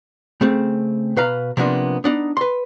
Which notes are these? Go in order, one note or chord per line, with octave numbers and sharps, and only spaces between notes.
C#3 A3 C4
B2 B4 F5 A#5
C3 F3 A#3 B3 D4
B3 D4 D#4
B4 C6